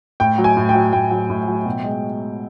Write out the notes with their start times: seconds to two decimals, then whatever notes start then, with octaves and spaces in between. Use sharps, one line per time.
0.20 A2 G5
0.38 F#3
0.44 G#5
0.57 A2
0.69 G5
0.75 F#3
0.93 A2 G5
1.11 F#3
1.30 A2
1.48 F#3
1.66 B2
1.84 G#3